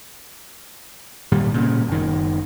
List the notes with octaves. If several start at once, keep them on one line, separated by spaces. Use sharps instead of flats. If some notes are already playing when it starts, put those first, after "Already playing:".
G#1 A#2 D#3 G3
A#2 C#3
F#1 D#3